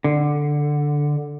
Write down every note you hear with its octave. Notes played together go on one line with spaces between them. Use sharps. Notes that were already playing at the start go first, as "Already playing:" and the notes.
D3